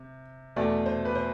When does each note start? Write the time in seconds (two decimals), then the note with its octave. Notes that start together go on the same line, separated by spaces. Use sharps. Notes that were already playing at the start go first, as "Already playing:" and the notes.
Already playing: C3
0.56 E2 B2 A3 D5
0.86 C5
1.05 B4
1.15 C5